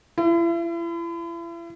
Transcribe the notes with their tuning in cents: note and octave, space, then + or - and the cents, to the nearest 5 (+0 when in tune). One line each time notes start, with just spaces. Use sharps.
E4 +40